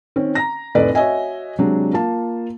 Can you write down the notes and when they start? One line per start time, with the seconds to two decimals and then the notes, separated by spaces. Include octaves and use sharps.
0.16 D#3 C4 C#4
0.35 A#5 A#6
0.75 F1 A2 B4 D5 D#5
0.95 F#4 C#5 D#5 E5 G#5
1.58 C3 F#3 G#3 D4
1.93 A#3 F4 A5